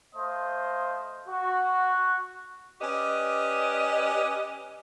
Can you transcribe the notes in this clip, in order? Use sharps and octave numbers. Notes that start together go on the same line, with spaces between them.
A3 C5 D#5 F5
F#4
C#4 G4 B4 D5 D#5